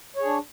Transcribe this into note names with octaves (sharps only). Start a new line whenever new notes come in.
D4 G#4 C#5